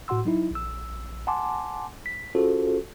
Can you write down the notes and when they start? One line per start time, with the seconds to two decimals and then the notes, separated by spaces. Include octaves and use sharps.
0.08 A2 F#4 F#5 C6 E6
0.25 F#3 D#4 E4
0.51 A#1 E6
1.27 F#5 G#5 A5 C6 D6
2.06 B6
2.35 C#4 F4 F#4 G#4 A4 C5